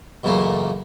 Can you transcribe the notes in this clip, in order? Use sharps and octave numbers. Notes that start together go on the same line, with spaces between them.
C#2 F#2 A#2 E3 A3 A#3